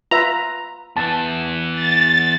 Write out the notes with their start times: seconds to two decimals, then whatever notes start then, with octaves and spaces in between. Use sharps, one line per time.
0.11 F4 B4 E5 A#5
0.96 E2 E3 A5
1.72 A6